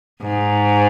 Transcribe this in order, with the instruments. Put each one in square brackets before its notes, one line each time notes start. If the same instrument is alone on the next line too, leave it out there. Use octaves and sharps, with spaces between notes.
[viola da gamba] G#2